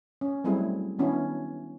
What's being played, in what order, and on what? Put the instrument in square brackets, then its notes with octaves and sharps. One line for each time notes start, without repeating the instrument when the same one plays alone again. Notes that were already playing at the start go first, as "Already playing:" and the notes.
[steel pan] C#4
F#3 G3 A3 C4 E4 G#4
D#3 B3 C#4 D4 E4 F#4